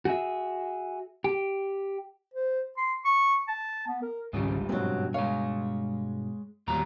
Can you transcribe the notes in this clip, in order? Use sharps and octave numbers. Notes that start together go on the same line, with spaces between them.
F#4 G#4 E5
G4
C5
C6
C#6
A5
B3
A#4
G#1 C#2 G#2 C#3 F3 G3
G2 B2 F#3 C4
G#3 C#5 F5
E2 A#2 D#3 F#3 G3 A#5